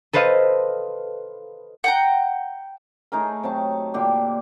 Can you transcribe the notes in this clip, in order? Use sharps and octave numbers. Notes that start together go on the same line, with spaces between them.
A4 B4 C5 D#5 F5
F#5 G5 A#5
A3 D#4 G#4 A#4
C3 F#3 A5
A#2 D3 G4